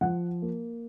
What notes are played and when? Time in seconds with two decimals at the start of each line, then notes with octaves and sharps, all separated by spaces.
0.01 F3 F#5
0.42 A#3